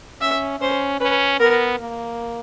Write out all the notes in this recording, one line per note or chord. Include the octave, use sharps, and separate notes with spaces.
C#4 E5
C#4 C5
C#4 B4
B3 A#4
A#3